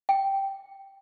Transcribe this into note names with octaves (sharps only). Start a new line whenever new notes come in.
G5